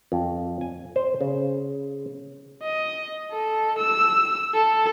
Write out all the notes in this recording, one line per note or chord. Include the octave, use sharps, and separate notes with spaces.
F2
G#5
C5
C#3
D#5
A4
E6
A4